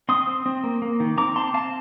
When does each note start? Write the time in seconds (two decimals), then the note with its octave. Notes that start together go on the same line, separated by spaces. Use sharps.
0.09 C4 C6 D#6
0.27 C4
0.46 C4
0.64 A#3
0.82 A#3
1.00 D#3
1.18 C4 A#5 D6
1.36 C4 A5 C6
1.54 C4 F5 A5